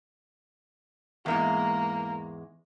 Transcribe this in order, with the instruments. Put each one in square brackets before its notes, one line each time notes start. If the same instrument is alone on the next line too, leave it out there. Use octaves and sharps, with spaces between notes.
[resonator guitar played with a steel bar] E2 G#2 G#3 [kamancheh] A#3